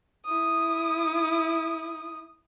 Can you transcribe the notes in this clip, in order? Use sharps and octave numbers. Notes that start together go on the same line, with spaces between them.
E4 D#6